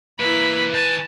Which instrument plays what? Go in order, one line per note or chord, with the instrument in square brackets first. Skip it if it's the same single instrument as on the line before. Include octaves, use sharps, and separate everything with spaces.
[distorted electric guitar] E3 A#3 [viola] E4 B5 [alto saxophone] B4
[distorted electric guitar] D#3 G#5 [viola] A5